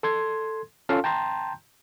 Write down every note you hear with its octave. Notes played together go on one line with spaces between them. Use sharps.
A4 C6 G#6
C#4 F4 A4 F5 A5 C6
G5 A5 A#5 C6 G6